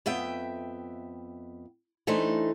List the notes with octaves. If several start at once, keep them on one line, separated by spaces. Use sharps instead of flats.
F2 B3 E5 G5
E3 A3 D4 D#4 C5